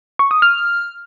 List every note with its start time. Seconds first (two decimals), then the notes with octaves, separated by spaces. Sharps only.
0.19 C#6
0.31 D#6
0.42 F6